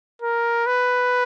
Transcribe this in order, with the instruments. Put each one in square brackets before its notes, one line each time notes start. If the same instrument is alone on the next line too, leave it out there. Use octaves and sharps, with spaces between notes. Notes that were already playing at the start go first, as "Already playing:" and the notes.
[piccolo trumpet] A#4
B4